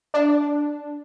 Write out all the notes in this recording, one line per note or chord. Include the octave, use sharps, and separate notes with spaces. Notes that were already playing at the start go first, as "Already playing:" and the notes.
D4